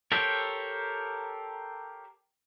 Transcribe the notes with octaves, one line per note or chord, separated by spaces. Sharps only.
G4 A4 A#4 C5 C#5